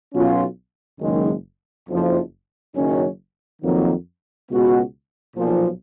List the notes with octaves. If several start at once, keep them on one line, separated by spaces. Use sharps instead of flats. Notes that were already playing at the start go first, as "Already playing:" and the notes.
B1 B2 F#3 C#4 F4
F#1 F#2 D#3 G#3
F#1 F2 F3
F#1 F#2 D#3 F#3 C#4
F2 D#3 F#3 A#3
C#2 B2 G#3 B3 F#4
B1 A#2 F3